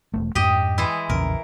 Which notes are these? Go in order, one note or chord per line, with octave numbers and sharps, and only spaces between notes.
E1 C#2 A3
F2 G#2 G4 D#5
E3 G#3 E4
A#1 E2 C#3 A#4